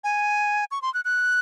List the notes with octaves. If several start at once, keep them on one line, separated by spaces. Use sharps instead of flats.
G#5
C#6
C6
F#6
F#6